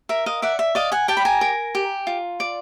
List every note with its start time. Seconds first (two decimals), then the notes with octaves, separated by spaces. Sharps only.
0.09 A#4 E5
0.26 D#5 F5
0.42 D5 E5 F#5
0.59 E5
0.75 D5 D#5 F5
0.92 F#5 G#5
1.08 G4 G5 A5
1.17 B5
1.25 G#5 A#5
1.41 A#4
1.75 G4
2.07 F4
2.40 D5